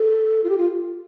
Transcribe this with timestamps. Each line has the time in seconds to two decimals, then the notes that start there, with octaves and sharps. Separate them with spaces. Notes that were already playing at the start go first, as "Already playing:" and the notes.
Already playing: A4
0.44 F4
0.49 G4
0.57 F4